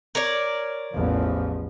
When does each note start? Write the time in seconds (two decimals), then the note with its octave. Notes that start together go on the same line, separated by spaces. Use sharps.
0.15 A#4 C#5 D5
0.94 A1 E2 F3